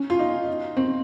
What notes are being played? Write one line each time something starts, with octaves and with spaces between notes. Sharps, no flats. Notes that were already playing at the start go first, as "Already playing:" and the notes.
Already playing: C#4
F4
D#4
C4